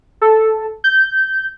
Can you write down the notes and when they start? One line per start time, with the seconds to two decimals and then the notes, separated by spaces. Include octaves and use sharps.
0.21 A4
0.84 G6